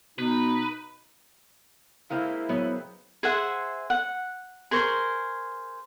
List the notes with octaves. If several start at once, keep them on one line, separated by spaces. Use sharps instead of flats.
B2 D#4 B4
G#3 A#3 C4 E4 F5
F#3 B3 C#5 D#5
G#4 C5 E5 F#5
F#5
G#4 A#4 C5 C#6